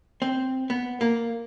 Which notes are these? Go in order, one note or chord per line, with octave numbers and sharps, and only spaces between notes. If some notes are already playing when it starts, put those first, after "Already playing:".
C4
B3
A#3